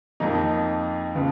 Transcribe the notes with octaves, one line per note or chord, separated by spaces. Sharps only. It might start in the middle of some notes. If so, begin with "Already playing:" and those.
F2 F3 A#3 D#4
C#3 F3 B3